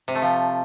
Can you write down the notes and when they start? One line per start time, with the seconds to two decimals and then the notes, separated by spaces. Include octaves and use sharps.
0.08 C3
0.15 A3
0.22 F3